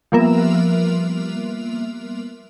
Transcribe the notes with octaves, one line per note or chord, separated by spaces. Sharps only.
F3 G3 A#3 B3 A#4 E5